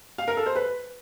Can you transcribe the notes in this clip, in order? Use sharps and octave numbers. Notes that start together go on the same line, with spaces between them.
F5
A#4
A4
C5
B4